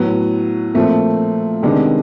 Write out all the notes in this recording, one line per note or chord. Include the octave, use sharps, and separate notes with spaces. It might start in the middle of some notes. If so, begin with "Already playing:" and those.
Already playing: A2 F#3 B3
A#2 F3 A3 C4
C3 D#3 G#3 B3 D4